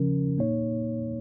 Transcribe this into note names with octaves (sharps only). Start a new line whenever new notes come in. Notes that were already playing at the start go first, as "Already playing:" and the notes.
Already playing: C#3 F3 C#4 A#4
A#2 A#3 D#4 C#5